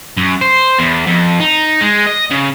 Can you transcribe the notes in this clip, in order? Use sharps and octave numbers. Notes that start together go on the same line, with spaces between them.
F#2
C5
E2
F2
D#4
G#3
D#5
C#3